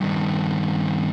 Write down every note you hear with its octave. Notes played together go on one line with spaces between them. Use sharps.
G2 D#3